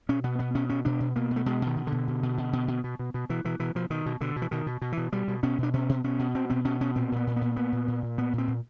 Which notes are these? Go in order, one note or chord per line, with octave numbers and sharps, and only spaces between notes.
B2 C#4
B2 B3
B2 B3
B2 C#4
B2 C#4
B2 D4
B2
B2 A#3
B2
A3
B2 G#3
B2 D#3
B2
D3
B2
B2
B2
B2
B2
B2
B2
B2
B2
B2 E3
B2 E3
B2 E3
B2 F3
B2 D#3
B2
B2 D3
B2
E3
B2 D#3
B2
B2
E3
B2
B2 G3
B2
B2 C#4
B2 D4
B2 C#4
B2
B2 C#4
B2
B2 C4
B2 C4
B2 C#4
B2 C#4
A#2 C4
A#2 B3
A#2
B3
A#2
A#2 B3
A#2
A#2
A#2
A#2 B3
A#2 C4
A#2